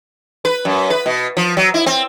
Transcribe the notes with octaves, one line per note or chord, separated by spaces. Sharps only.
B4
F#2
B4
B2
F3
F#3
E4
C4